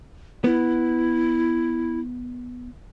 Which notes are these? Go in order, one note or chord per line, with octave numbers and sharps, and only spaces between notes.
B3 E4